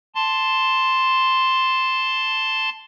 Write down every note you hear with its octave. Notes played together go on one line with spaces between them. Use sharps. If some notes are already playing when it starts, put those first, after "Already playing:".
A5 C6